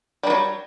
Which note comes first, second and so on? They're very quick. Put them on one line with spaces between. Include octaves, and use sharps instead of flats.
G3 D#3 F#3